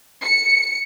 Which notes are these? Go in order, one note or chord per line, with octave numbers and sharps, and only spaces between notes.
C#7